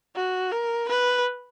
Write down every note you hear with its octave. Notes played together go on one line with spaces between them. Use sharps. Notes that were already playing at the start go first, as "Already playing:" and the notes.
F#4
A#4
B4